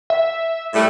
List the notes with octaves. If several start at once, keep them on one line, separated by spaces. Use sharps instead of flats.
E5
A2 G3 A3